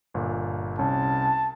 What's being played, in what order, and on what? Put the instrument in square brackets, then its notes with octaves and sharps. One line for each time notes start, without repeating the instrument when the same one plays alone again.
[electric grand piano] G1 A#2
[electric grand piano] C2 C#4 [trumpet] A5